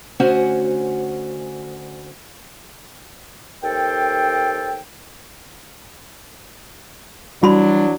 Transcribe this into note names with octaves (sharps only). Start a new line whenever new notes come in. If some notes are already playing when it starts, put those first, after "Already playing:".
D2 C#4 F#4 C5 F#5 G#5
D#2 A4 C5 G5
E3 F#3 G3 D4 F#4 B5 C6